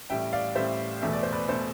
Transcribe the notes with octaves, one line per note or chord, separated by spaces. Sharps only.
A1 A2 G3 E5 G5
D5 F5
A1 A2 G3 C5 E5
E2 B2 A3 E5
D5
C5
B4 D5
B2 A3 A4 C5